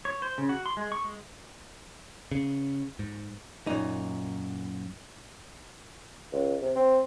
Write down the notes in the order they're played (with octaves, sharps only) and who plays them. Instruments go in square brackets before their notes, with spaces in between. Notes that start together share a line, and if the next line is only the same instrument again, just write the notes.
[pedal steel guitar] C#5
C5
C#3
F#4
C6
G#3
C#6
G#3
[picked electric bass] C#3
G#2
[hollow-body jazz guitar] F#2 A#2 D#4
[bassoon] C#2
C3
C4